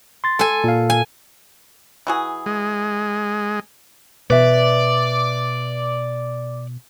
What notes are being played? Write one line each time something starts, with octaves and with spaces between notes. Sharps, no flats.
C6 A6
A4 G#5
A#2 F5
G#5
E3 F#4 G#4
G#3
B2 B4 D5 E5